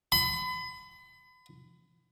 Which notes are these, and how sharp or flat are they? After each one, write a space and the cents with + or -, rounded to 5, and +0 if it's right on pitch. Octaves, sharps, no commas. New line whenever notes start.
B5 +35